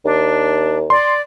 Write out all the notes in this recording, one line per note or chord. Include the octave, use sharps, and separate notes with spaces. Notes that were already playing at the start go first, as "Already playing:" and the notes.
D#2 D4
D5 C6